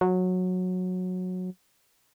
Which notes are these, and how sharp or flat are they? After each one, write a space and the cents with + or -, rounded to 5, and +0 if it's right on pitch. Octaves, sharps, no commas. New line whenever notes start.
F#3 -15